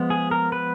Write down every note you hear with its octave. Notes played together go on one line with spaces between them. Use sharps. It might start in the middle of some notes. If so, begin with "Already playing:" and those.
Already playing: F3 G#3 B3
G#4
A#4
B4